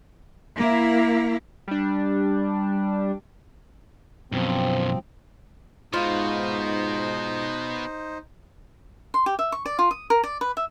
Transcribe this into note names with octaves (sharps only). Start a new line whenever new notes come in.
A#3 E4
G3 D4
F#2 B2 F3 C4
G#2 B2 D#4 F4 C5
C6
G4
E5
C#6
D5
F4
D#6
A#4
D5
B4
E5